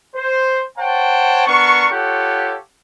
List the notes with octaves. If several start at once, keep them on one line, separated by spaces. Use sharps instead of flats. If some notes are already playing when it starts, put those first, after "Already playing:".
C5
C5 C#5 F#5 G5 A5
B3 D4 A#4 C#6
F4 G4 A4 C#5 F#5